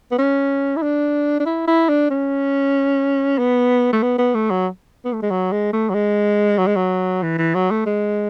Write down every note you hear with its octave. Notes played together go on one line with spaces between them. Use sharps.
B3
C#4
E4
D4
D4
E4
E4
D4
C#4
B3
A3
B3
B3
A3
F#3
B3
A3
G#3
F#3
G#3
A3
F#3
G#3
F#3
G#3
F#3
E3
E3
F#3
A3
G#3